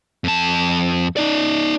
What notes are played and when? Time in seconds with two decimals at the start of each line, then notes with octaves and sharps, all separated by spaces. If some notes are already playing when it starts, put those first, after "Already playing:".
0.24 F2 A5
1.17 D#4 D5